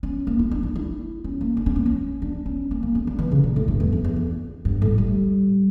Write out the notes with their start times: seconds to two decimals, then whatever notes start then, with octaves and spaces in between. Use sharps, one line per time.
0.03 C#4
0.27 A#3
0.39 E4
0.51 D4
0.63 D4
0.76 E4
1.24 C#4
1.41 A#3
1.57 D4
1.66 C#4
1.76 A#3
1.86 C#4
2.22 D4
2.46 C#4
2.71 A#3
2.83 A#3
2.95 C#4
3.07 D4
3.19 E3
3.32 C#3
3.44 A#2
3.56 A2
3.68 G2
3.80 E2
3.93 F2
4.05 E2
4.16 F2
4.65 G2
4.82 A2
4.98 G3